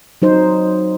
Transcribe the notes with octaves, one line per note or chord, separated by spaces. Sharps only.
F#3 D#4 C5